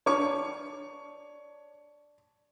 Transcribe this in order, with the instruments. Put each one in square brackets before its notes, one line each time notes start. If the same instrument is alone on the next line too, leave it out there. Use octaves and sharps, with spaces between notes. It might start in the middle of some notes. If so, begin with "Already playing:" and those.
[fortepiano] D4 [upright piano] C#5 C#6